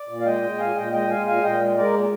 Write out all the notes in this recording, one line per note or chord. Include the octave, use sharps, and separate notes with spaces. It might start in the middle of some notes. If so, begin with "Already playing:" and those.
Already playing: D5
A#2
F5
G#3 D#5 G5
G#3
A#2 F5 G#5
A#2 D#5 G5
G#3 D#5 G5
G#3 F5 G#5
A#2 F5 G#5
A#2 D#5 G5
G#3
G#3 A#4 D5
A#2